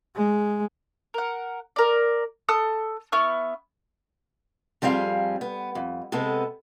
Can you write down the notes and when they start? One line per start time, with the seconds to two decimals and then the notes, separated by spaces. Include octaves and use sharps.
0.15 G#3
1.14 A#4 F#5
1.76 A#4 D5
2.49 A4 D#6 F#6
3.12 B3 E4 C#6 F6
4.82 F2 G3 C4 G#4 F5
5.41 B3
5.75 F2
6.12 C3 G#3 B3 A4